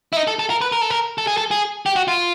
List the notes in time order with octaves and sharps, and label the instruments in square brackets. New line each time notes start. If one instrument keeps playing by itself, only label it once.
[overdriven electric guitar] E4
D#4
A4
A4
A#4
B4
A#4
A4
A#4
A4
G#4
A4
G#4
G4
F#4
F4